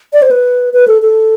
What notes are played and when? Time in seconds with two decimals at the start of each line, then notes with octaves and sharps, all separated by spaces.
0.13 D5
0.22 C5
0.31 B4
0.73 B4
0.88 A4
1.02 A4